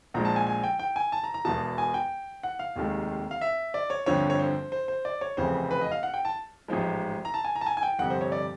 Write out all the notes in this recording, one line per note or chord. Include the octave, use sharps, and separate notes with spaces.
A#1 A#2 F3 G#3 A#5
A5
G#5
G#5
G5
G5
G#5
A5
A#5
A#5
E1 E2 B2 A5
G#5
G5
F#5
F5
F1 D#2 D#3 G#3
F5
E5
D5
C#5
G1 F2 D3 F3 C#5
C#5
C5
C5
C5
D5
C#5
F1 F2 C#3 E3 C5
B4
D#5
F5
F#5
G5
A5
A1 G#2 F3 G#3
A#5
A5
G#5
A#5
A5
G#5
G#5
G5
G1 F2 C3 F#5
C5
C#5
D5